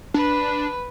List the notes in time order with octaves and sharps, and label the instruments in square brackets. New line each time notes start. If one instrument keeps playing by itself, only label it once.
[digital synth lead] D4 [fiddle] B4